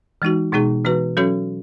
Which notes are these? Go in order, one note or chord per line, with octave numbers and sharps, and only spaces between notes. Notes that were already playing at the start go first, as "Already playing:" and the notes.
E3 G#3 D#4 F#4
B2 G#3 B3 D#4 G#4
E3 B3 F#4 B4
F#3 C#4 F#4 A4 C#5